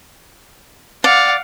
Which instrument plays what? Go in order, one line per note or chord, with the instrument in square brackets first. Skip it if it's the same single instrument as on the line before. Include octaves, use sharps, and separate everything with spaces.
[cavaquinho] D5 [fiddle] F5 F#5